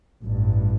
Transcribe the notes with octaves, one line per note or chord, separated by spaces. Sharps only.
A1 G2